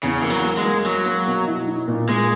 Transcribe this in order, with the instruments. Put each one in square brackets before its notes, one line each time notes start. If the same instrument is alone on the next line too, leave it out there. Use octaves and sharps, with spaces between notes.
[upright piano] E2 [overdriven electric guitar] C#3
[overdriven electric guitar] E3 [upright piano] A#3
[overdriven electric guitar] F#3
[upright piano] A#3
[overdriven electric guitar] G#3
[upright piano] A#3
[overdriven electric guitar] F#3 [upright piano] A#3
[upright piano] A#3
B2
E4
D#4
A#2
[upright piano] A#2 [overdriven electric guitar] G#3